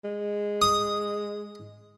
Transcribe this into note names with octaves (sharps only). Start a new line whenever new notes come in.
G#3
D#6